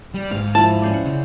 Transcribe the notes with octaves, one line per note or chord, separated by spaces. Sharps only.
G3
G#2 F5
F3 E4 A5
C#4 C5 D5
F#5
C#3